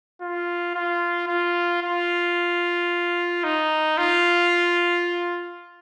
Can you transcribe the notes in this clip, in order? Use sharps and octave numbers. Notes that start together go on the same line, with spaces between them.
F4
F4
F4
F4
D#4
F4